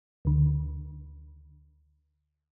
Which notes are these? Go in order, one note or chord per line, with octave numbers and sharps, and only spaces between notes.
D2 D3